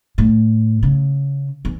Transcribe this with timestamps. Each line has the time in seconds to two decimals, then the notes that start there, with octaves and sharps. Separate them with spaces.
0.18 A2
0.83 C#3
1.65 E2